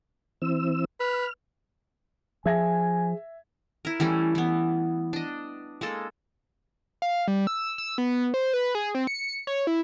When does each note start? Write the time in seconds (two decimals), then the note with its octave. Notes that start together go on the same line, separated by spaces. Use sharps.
0.42 E3 C4 E6
1.00 B4 F6
2.46 F3 G#4 E5 G#5 G#6 A#6
3.85 E4 A#4
4.00 E3 G3 A3 C#4
4.35 E3 B3
5.13 D4 D#5
5.81 G#3 A#3 A4
7.02 F5
7.28 G3
7.47 E6
7.78 E6
7.98 B3
8.34 C5
8.54 B4
8.75 G#4
8.95 C4
9.07 C#7
9.47 C#5
9.67 E4